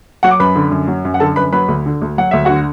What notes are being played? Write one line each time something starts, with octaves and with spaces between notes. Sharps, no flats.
F#3 F#4 F#5
D6
F#2 B4 B5
D3
F#2
F#3
F#2
F#5
D3 A4 A5
F#2 B4 B5
F#3 B4 B5
D2
D3
D2
F#3 F#5
D2 E5
D3 F#4 F#5